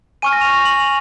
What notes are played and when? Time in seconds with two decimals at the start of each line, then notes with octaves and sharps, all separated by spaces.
0.22 G#5 C#6 F6 D#7
0.33 A#6
0.41 F7
0.52 F7
0.65 F#7
0.80 F7